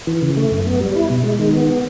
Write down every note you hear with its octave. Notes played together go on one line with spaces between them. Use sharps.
E3
C#3
A3
F#2
B3
G3
E4
B2
G#3
D#3
B3